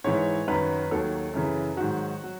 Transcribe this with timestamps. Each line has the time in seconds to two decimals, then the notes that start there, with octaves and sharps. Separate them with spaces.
0.04 G#2 E3 C#5
0.47 F#2 D#3 F#3 B4
0.91 D#2 D#3 F#3 A4
1.34 F#2 C#3 E3
1.77 G#2 D#3 F#3 F#4
2.24 F#3